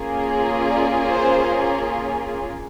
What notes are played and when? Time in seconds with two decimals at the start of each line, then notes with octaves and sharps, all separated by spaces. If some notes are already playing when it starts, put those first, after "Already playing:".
Already playing: A#3 C#4 F4 G#4
0.71 D5
1.11 C5